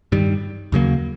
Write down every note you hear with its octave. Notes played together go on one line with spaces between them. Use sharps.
G2 D#3 G3
D#2 C#3 F#3 A#3